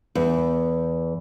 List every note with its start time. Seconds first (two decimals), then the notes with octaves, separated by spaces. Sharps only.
0.15 E2